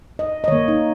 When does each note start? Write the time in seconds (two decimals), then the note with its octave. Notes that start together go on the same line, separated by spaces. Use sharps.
0.19 D#5
0.44 D#5
0.48 D#3 A#3 C#5
0.68 D#4